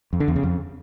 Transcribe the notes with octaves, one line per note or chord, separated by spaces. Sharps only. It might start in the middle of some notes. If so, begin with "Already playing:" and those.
F2
D3
E2
C#3
F2